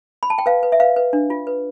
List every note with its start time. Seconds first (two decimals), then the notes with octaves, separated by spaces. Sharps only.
0.23 B5
0.30 A5
0.38 G5
0.46 B4 F5
0.63 B4
0.72 E5
0.80 B4 F5
0.96 B4
1.13 D4
1.30 F4
1.47 B4